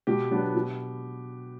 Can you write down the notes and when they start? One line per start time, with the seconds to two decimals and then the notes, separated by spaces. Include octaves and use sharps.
0.07 B2 G4
0.31 F#3 B3 D4
0.54 B2